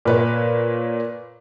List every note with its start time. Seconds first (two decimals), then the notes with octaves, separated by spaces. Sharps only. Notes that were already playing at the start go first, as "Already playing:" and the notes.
0.05 A#2 B4 C#5